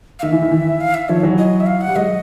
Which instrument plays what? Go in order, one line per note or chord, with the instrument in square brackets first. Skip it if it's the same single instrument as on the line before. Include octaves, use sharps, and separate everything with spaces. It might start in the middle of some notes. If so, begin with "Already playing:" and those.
[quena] F5
[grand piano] D#3 [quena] E5
[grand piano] E3
D#3
E3
[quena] F5
E5
[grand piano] D#3 F3 [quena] C#5
[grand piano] E3 F#3
[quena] D#5
E5
F5
F#5
[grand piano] G3
[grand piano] F#3 G#3 [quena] D#5